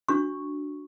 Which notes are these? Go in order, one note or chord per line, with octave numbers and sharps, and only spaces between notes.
D4 F#4 C#6